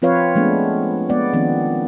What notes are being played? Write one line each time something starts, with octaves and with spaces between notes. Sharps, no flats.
F3 C4 F4 B4 C#5 F5
F3 G#3 A3 B3 D4
G#3 B3 D5 F#5
D#3 F3 B3 C4 D4